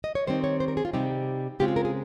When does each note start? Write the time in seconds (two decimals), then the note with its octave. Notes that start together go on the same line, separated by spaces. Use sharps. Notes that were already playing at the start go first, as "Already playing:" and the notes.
0.04 D#5
0.15 C#5
0.27 D#3 G3 C4 D#4 C5
0.44 C#5
0.60 C5
0.68 A#4
0.77 G#4
0.85 F4
0.93 C3 G3 C4 D#4 G4
1.60 C#3 G#3 C4 F4 G4
1.68 G#4
1.76 A#4
1.85 G#4